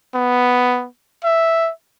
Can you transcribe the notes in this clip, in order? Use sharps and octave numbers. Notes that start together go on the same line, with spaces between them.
B3
E5